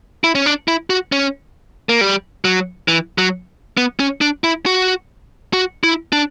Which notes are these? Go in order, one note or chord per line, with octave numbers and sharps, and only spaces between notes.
E4
C#4
D4
E4
F#4
C#4
A#3
G3
F#3
E3
F#3
B3
C#4
D4
E4
F#4
F#4
E4
D4